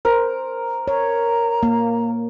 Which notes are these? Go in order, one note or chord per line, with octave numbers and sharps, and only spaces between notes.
A#4 C5
C#5 A#5
A#3